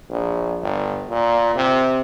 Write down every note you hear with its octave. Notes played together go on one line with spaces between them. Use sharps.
A#1
G1
A#2
C3